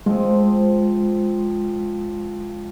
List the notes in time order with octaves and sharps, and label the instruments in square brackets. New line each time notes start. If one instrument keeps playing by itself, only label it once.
[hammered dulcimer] F3 C4 [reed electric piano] G#3